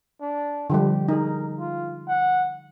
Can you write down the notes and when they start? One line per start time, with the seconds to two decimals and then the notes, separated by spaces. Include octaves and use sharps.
0.21 D4
0.70 D3 F3 G3 G4
1.08 D#4 G#4 A#4
1.59 F4
2.08 F#5